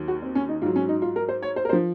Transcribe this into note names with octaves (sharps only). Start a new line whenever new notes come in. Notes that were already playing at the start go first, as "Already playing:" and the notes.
Already playing: D#2 D#3 F#3
F#4
C4
C#4
D#4
G#2 F#3 F4
C#4
D#4
F4
A#4
C5
C#5
C5
A#4
C5
F3